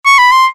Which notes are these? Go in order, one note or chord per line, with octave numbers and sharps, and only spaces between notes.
C#6
B5
C6